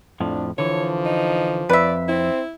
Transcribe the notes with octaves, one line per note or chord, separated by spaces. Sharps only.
F2 A2 F3 D4
D3 E3 F3 C#5
D#4
F2 B4 D5 E5
C4 E4